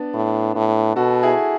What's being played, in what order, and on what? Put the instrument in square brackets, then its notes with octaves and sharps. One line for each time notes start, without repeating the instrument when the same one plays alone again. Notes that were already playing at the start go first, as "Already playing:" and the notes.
Already playing: [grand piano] B3 D4
[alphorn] A2
A2
[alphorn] B2 [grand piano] F#4 A4
[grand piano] E4 G#4